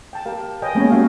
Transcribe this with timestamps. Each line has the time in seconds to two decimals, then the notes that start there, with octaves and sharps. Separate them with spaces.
0.13 G5 A5
0.26 G4 A#4 F5
0.62 A#4 B4 C#5 D#5 G5 G#5
0.75 G#3 A#3 B3 C#4 G4 C#5
0.90 G3 C#4 F#4 E5 F5 A5